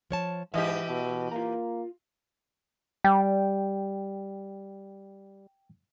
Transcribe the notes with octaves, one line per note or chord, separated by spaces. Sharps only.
F3 C#5 A5
G#2 E3 G4 B4 D#5 E5
B2
A#3 F4 A#5
G3 G5